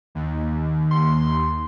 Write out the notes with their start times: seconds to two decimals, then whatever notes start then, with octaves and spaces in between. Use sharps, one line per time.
0.15 D#2
0.91 C6